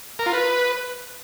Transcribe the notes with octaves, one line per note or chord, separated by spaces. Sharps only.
A#4
F4
B4